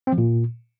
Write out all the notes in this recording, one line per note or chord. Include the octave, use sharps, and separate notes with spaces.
C4
F3
A#2